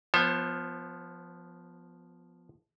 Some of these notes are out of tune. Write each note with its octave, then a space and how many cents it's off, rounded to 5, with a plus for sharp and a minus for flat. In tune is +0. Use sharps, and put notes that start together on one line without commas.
F3 +0 B3 +0 C5 +40